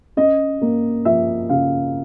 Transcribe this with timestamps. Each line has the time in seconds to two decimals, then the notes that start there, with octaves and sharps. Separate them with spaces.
0.17 C#4 D#5
0.61 A#3
1.05 F3 E5
1.49 C#3 F5